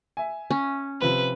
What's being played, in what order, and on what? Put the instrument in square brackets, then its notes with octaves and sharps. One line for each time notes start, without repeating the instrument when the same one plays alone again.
[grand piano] E5 G#5
[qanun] C#4
[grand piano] C3 F3 C4 [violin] B4